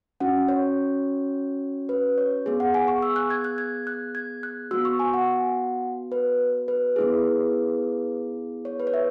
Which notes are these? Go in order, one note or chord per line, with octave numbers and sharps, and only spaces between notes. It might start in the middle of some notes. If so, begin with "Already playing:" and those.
C#4 F#4 F#5
C#5
B4
C#5
B3 G#4
F#5
G#5
C#6
E6
F#6
G#6
F#6
G#6
F#6
G#6
F#6
B3 F#4 E6
C#6
G#5
F#5
B4
B4
B3 E4 G#4
C#5
B4
C#5
E5